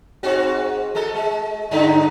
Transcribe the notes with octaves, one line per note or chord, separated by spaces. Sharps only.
G#2 C4 F#4
G#3 A4
G#3
G2 D3 D#4